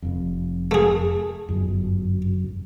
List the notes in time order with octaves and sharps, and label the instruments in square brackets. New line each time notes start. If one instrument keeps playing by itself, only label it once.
[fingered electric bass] F1 F2
[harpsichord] A3 G#4
[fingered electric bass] G1 [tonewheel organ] F#2